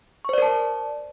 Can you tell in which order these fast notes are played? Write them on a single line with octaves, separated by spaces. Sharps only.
C#6 C5 D5 A#4 A5